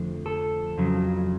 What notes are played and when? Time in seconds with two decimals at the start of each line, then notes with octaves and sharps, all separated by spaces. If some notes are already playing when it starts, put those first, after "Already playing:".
Already playing: F2 D3 F3 A3 C4
0.26 A4
0.78 F2 C#3 F#3